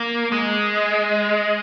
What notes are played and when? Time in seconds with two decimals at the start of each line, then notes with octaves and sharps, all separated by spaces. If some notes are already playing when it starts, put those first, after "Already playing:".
Already playing: A#3
0.32 G#3